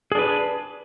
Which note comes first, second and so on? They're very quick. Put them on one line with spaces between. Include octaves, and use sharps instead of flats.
G#4 D4 B4